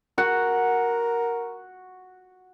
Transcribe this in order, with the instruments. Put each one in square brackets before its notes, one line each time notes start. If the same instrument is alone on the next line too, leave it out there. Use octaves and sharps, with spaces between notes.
[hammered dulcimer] F#4 F#5 [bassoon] A#4